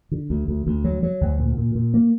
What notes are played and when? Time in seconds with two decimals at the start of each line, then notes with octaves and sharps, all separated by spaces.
0.11 D3
0.30 D2
0.48 D2
0.67 D2
0.84 F#3
1.03 F#3
1.21 D2
1.40 A#2
1.57 A#2
1.75 A#2
1.94 A#3